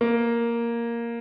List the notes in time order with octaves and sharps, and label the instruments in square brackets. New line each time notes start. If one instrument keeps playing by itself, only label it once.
[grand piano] A#3